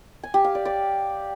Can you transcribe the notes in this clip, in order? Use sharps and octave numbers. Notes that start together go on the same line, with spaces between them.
G#5
G4
F5
D5
D5